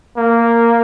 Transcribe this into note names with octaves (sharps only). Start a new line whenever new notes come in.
A#3